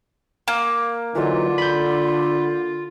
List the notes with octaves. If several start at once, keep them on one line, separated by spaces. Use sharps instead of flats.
A#3
D3 E3 F#3 D#4 F4
B5 G6